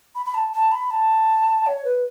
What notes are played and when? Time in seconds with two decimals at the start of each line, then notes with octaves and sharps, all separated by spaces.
0.15 B5
0.26 B5
0.34 A5
0.53 A5
0.72 B5
0.91 A5
1.66 C#5
1.85 B4